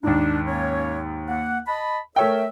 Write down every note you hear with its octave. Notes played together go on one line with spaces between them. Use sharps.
D#2 G#2 D4
A#3 C#4 C#5
A#3 F#5
D#5 A5 B5
A3 A#4 C#5 E5 G5